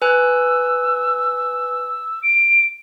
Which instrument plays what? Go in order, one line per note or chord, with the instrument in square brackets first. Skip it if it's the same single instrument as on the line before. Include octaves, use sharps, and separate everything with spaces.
[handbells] B4 G#5 F#6 [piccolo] E6
[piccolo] D7